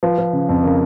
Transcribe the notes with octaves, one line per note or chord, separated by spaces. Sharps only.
F3 B4
F3
C#3
F2
C#3 A#4